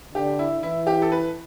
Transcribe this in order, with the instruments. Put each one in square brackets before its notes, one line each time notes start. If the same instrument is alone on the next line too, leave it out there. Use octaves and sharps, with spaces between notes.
[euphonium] D3 [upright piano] G4
[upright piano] E4
[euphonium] E3 [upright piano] E4
[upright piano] G4
A4
B4